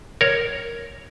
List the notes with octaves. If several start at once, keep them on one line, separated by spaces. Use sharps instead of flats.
A#4 C#5